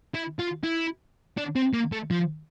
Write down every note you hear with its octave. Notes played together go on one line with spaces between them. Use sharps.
E4
F4
E4
D4
C4
A#3
A3
F3